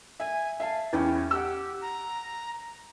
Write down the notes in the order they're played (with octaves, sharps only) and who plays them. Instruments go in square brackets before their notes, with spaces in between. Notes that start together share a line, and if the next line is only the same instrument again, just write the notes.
[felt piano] E5 [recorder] G#5
[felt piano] E5 A5 [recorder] F5
[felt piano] E2 E4 G5 [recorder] C#4
[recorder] G4 [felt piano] F#5 E6
[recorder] A#5